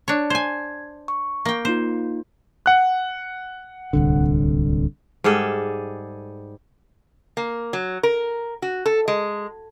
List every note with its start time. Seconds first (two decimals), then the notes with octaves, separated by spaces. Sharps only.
0.08 D4 C#5
0.30 C5 G#5 G#6
1.08 C#6
1.45 A#3 G5
1.65 A#3 D#4 F4 C5
2.66 F#5 F#6
3.93 D1 C2 D3
5.24 G#2 G3 G#4 A4
7.37 A#3
7.73 F#3
8.03 A#4
8.62 F#4
8.86 A4
9.08 G#3